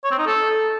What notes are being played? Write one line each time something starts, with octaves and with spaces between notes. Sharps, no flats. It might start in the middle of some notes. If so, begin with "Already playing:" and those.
C#5
C4
D#4
A4